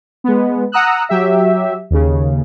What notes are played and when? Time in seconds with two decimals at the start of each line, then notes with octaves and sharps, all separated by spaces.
0.24 G#3 B3
0.72 F#5 A#5 D#6 E6 F#6
1.09 F#3 G4 E5
1.91 D#2 C#3